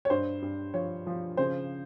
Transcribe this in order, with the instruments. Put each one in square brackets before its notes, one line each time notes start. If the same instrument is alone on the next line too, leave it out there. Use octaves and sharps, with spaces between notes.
[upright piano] C#5
G2 C5
G2
F3 C#5
F3
C#3 C5